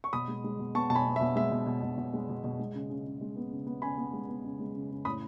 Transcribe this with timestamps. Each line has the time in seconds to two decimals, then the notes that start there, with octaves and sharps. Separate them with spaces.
0.04 C#6
0.13 B2 B5 D#6
0.28 G#3
0.44 G#3
0.59 B2
0.75 B3 A5 C#6
0.90 B2 A5
0.94 G#5 B5
1.06 B3
1.16 E5
1.21 B2
1.36 G#3 E5
1.51 B2
1.66 B2
1.82 B2
1.98 B2
2.14 G#3
2.29 B2
2.44 B2
2.59 G#3
2.74 C#3
2.89 C#3
3.06 C#3
3.21 G#3
3.36 B3
3.51 C#3
3.67 B3
3.82 C#3 G#5 B5
3.98 B3
4.13 G#3
4.29 B3
4.45 C#3
4.60 G#3
4.75 C#3
4.91 C#3
5.05 A2 B5 D#6